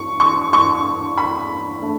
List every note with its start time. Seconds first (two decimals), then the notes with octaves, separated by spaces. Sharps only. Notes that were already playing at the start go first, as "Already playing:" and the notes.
Already playing: C#6
0.20 C#6
0.53 C#6
1.18 B5
1.82 A3 D4